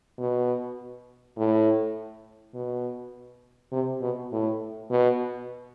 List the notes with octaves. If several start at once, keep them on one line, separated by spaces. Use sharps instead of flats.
B2
A2
B2
C3
B2
A2
B2